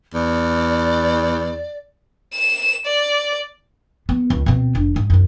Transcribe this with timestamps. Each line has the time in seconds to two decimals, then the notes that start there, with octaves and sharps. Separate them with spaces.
0.14 E2 D5
2.34 E7
2.86 D5
4.09 B3
4.30 C#2
4.46 B2 C4
4.75 F1 D4
4.96 G#2
5.10 C2 F#2